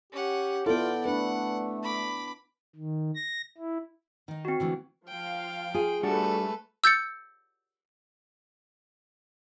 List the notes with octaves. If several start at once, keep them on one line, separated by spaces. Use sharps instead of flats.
C#4 G4 F#5
B3 E4 F4 A4 D5 G5
A3 D4 B4 F#5
B5 D6
D#3
A#6
E4
D#3 D#4
C4 F#4
D3 E3 A3
F3 F5 G5
F4 G#4
G3 A3 D4 F#4 A4 B4
E6 G6 A6 C#7